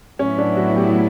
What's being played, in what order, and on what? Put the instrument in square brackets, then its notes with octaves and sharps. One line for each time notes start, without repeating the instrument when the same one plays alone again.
[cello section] A2 F#3 B3 E4 [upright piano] C#4
[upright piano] D4
F#4
G4